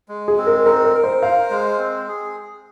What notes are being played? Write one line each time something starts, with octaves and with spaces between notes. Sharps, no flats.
G#3
G#4
C4
A#4
D#4 A#4
A#4
A#4
C5
C5 F5
G#3
C4
G#4